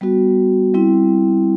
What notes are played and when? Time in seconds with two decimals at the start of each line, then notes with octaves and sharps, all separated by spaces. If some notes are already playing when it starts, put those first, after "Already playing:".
0.01 G3 B3 F#4
0.74 G3 C4 E4